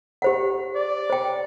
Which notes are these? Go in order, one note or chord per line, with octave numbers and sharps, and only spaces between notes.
G4 C5 F#5
D5
C5 G5